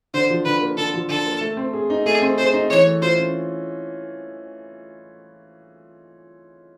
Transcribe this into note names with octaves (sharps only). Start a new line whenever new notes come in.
D3 C5
F3
D3 B4
A#3
D3 A4
F3
D3 A4
A#3
A3
C4
G#4
D#4
A3 G#4
C4
G#4 C5
D#4
E3 C#5
A3
F4 C5
C#4